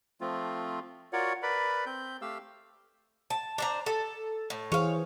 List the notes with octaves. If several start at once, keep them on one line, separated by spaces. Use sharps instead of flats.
F3 A3 C4 F4
F4 F#4 A#4 C#5 D5 F#5
A#4 B4 D5 B5
C4 G6
A3 G4 F5 E6
A5
D4 C5 A#5
A4
A2
E3 G#4 C5 C#5 F5